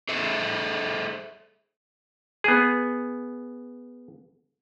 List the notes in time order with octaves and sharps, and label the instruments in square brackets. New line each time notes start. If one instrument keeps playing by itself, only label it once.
[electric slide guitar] G#4 A4 C5 E5
[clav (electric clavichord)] B3 G#4